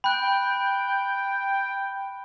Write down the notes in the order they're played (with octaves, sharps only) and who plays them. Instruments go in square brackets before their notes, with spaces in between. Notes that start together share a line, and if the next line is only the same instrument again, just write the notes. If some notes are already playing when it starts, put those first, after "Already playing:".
[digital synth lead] G5 [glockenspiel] B5 F#6